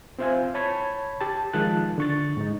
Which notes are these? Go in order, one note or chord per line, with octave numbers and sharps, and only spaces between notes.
C4 F4 C5 E5 F5 G#5
C#5 A5 B5 C#6 G#6
G4 A5
D#3 F3 G#3 F4 A5 F#6
D3 C#6 A6
G#2 D#4